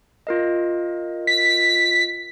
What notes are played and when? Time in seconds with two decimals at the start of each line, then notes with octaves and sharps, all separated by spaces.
0.27 F4 A#4 D#5
1.27 B6